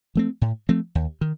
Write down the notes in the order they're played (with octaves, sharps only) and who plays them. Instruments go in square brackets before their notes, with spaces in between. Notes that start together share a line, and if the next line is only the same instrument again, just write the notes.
[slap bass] F3 A3 C4
A2
F3 A3 C4
D#2
D#3